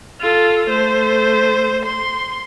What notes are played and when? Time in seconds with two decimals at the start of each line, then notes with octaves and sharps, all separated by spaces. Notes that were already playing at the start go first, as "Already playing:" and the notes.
0.21 F4 A4
0.69 A3 C5
1.85 C6